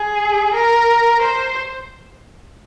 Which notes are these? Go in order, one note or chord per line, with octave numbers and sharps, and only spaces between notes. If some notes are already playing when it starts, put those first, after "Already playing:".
Already playing: G#4
A#4
C5